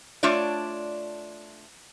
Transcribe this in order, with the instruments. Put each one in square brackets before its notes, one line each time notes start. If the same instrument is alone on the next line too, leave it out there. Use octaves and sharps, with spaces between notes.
[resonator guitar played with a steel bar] A3 D4 F4 C#5 D5